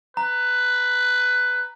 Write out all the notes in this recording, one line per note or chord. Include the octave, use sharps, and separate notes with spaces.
B4 A#5